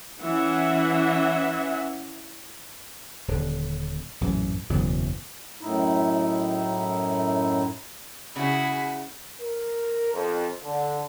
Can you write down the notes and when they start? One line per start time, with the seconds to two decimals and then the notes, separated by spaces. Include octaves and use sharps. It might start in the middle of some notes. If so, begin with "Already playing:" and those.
0.22 E3 C#4 E5 F#5
3.28 D#1 D3
4.21 A#1 F#2 A2 E3
4.69 F#1 E2 B2 F#3
5.61 F#2 A2 D#4 E4
8.36 C#3 E4 F#4 G#4 G#5 B5
9.41 A#4
10.13 F2
10.63 D3